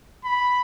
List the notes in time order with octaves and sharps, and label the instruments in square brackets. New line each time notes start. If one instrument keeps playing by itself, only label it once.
[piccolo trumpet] B5